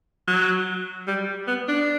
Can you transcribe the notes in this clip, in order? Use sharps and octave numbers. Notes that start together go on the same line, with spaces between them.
F#3
G3
B3
D4